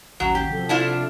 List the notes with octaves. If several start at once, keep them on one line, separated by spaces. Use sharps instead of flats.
A1 D#2 F#3 C#4
G4
C3 F3 A4
D4 E4 F4